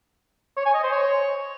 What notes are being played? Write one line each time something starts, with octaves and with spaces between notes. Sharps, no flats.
C#5
G#5
D#5
C5
C#5